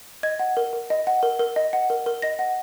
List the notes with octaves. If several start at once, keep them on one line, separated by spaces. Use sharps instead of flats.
D#5 G#6
F#5
A#4
A#4
D#5
F#5
A#4
A#4
D#5
F#5
A#4
A#4
D#5 A#6
F#5